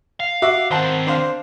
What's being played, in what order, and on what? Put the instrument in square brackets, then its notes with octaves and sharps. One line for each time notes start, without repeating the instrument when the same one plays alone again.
[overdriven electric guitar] F5
[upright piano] F#4 E5 D6
[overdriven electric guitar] D#3 C4 [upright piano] C5 F#5 A5
[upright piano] D4 C5 F5